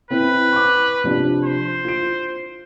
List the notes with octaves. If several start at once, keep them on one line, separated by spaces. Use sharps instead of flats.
C4 E4 B4
C#6 D6
C3 F3 D4
C5
F4 D7